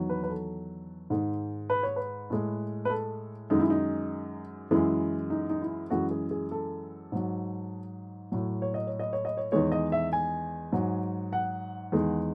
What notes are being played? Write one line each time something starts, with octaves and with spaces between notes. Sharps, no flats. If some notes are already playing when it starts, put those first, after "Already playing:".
Already playing: E2 D#3 F#3
B4
B4
A4
G#2 D#3 G#3
B4
C#5
B4
A2 G#3
B4
A4
F#2 D#3 G#3 D#4
E4
D#4
F#2 E3 G#3 E4
D#4
D#4
E4
F#2 E3 G#3 F#4
G#4
G#4
A4
G#2 F#3
A2 F#3
C#5
D#5
C#5
D#5
C#5
D#5
C#5
E2 D#3 G#3 C#5
D#5
E5
G#5
G#2 F#3
F#5
E2 D#3 G#3